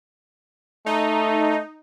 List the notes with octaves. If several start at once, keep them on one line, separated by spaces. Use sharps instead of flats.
A3 D#4